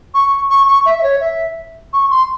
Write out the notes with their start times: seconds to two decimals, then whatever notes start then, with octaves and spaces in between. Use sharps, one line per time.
0.14 C#6
0.50 C#6
0.68 C#6
0.86 E5
0.99 E5
1.03 C#5
1.21 E5
1.93 C#6
2.10 C6